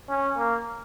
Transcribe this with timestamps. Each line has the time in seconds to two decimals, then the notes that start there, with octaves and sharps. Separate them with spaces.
0.09 C#4
0.37 A#3